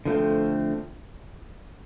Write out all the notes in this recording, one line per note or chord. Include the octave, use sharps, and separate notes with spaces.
D3 F3 A3 C4